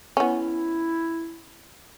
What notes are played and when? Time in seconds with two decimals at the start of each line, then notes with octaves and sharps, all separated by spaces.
0.17 B3 C#4 E4